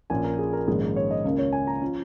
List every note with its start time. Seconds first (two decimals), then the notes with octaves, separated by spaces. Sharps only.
0.10 A#1 A#2 A#3 C#4 G#5
0.24 A#4
0.39 G#4
0.53 A#4
0.67 A#1 G#2 D#3 A#3 C#4 G#4
0.82 A#4
0.96 C#5
1.11 D#5
1.25 C#2 C#3 A#3
1.38 C#5
1.52 G#5
1.67 A#5
1.81 F3 C#4